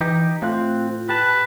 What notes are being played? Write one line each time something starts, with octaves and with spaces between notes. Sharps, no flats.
E3 D#4 G4
A2 C4 F4 F#6
G4 B4 A5 A6